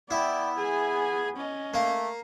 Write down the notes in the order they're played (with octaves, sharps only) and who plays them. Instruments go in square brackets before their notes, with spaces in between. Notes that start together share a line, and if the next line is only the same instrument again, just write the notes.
[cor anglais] B3 [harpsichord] E4 [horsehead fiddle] D5 G5
[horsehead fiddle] G#4 G#5
C#4 D#5
[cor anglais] A3 [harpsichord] A#3